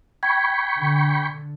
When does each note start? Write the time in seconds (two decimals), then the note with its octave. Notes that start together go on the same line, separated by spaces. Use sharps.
0.23 G5 B5 C#6 G#6
0.79 D3